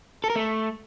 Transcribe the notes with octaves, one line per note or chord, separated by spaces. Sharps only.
A4
A#4
A3